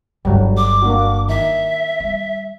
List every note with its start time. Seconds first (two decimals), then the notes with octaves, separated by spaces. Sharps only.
0.25 G1 G2 D3 F#3 G3
0.57 D6
0.82 A#3 D4 F#4
1.28 D#3 D#4 E5
2.00 G3